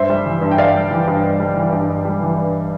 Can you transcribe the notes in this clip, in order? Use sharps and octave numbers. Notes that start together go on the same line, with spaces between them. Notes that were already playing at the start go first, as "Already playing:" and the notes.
Already playing: G2 C5 E5
G3
E3
G2
G5
G2 D5 F5
G3
E3
G2
G2
G3
E3
G2
G2
G3
E3
G2